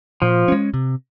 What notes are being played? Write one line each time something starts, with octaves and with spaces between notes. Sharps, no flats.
A#2 F3
G#3 C#4
C3